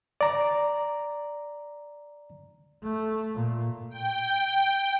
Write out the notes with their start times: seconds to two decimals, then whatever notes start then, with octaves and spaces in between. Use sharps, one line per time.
0.21 D5 A#5
2.84 A3
3.36 A#2
3.90 G5